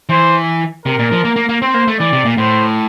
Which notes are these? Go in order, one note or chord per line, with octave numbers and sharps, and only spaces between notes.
E3 C5
C3 A#4
A#2
F3
A#3
A#3
A#3
C4 C5
A#3
A3
E3 D5
C3
A#2
A2 C5